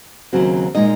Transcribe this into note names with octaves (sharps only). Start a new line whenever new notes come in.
D#2 C#3 F#3 C4 F#4
A#2 F3 G#3 D#4 D#5